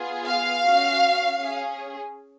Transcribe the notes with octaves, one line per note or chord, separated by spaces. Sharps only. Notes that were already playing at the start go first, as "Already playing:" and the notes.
Already playing: B3 F4 G#4
F5
C#4 F#4
C#4 G#4